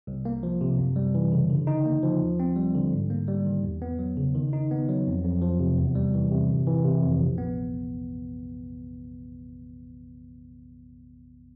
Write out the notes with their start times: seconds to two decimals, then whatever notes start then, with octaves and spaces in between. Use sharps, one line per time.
0.07 C2
0.25 A#3
0.43 F3
0.61 C3
0.78 F#2
0.96 G3
1.15 E3
1.32 C#3
1.50 D3
1.67 D#4
1.86 A#3
2.03 F3
2.21 D#2
2.40 C4
2.56 G3
2.75 D3
2.93 G#2
3.10 A#3
3.28 G3
3.46 D#3
3.64 E2
3.82 B3
3.99 F#3
4.17 C#3
4.35 D#3
4.53 D#4
4.71 B3
4.89 F#3
5.07 F2
5.25 F2
5.42 F3
5.59 C3
5.77 E2
5.95 G3
6.14 E3
6.31 C3
6.49 G1
6.67 E3
6.85 C3
7.03 F2
7.20 A#1
7.38 B3